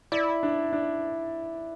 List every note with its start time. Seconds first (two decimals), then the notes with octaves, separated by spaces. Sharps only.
0.12 E4 D5
0.43 D4
0.73 D4